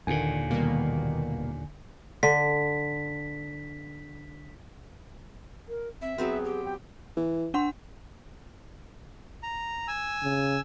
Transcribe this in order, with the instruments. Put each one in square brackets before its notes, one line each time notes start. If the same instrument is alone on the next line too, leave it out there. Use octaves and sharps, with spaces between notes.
[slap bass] D#2 A#2 [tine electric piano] D3 G#5 [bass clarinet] D#3
[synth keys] G2 B2 A#3 [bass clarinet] D#3
[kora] D3 [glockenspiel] B6
[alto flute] A#4
[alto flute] C4 [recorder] E5
[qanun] F#3 B3 C4 [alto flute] G#4
[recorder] G4
[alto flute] G5
[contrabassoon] E3
[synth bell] D4 F#5 C6
[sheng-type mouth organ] A#5
G#5 E6
[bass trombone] C#3